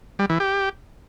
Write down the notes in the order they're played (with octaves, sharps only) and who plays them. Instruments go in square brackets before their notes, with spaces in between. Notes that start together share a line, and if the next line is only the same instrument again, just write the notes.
[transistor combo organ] G3
E3
G4